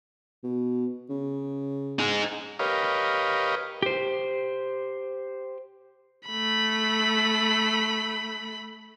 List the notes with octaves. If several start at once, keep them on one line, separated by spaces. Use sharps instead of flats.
B2
C#3
D#4 G#4
G4 A#4 B4 C#5 D#5 F5
G4 C5
A3 B5